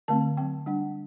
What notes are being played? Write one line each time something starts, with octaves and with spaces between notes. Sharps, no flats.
D3 A3 C4 A5
F#3 C4 G5
G3 D4 F#5